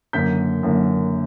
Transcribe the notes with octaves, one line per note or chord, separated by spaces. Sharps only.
F#1 F#2 D3 A#3 G6 B6
F#1 F#2 D3 A#3